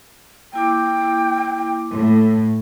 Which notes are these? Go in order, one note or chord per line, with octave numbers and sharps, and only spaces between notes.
A#3 E4 G5 D6
A2